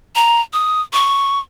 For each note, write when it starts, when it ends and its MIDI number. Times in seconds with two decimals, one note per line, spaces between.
0.16 0.41 82
0.53 0.81 87
0.93 1.40 85